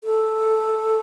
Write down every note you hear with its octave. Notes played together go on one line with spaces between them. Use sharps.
A4